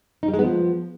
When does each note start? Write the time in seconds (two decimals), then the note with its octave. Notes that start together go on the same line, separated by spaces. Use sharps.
0.23 D#4
0.28 G3
0.34 G#3
0.39 B3
0.44 F3